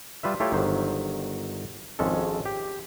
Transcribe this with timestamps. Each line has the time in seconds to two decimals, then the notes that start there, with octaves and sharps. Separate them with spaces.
0.23 G3 F4 B4 E5
0.40 A3 E4 F4 G4 C#5
0.52 G1 D#3 F#3 C5
1.99 G#1 F2 G#3 C#4 A4
2.46 G4